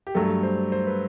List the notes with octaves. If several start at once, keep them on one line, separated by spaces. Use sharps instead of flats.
G4
G2 F#3 A3 A4
C5
C5
B4